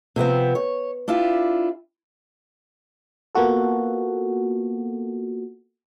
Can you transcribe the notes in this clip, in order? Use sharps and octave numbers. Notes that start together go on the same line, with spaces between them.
C3 F3 B3 C4
C#5
D4 E4 F4 G4
A#3 B3 F4 F#4 A4